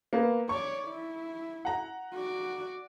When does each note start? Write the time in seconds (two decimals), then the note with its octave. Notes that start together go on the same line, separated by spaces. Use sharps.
0.13 A#3 B3
0.49 C#5 D5 C#6
0.88 E4
1.65 F#5 A#5
2.14 F#4 D5